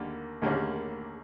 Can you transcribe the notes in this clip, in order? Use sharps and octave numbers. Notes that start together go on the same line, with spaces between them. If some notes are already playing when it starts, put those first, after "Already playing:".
Already playing: D#2 D3 G3 A#3
D#2 D3 G3 A#3 C#4